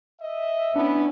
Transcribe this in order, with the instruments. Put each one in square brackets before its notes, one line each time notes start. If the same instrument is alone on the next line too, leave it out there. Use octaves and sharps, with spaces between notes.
[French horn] D#5 [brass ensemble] E5
[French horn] B3 [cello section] C#4 E4 [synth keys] D4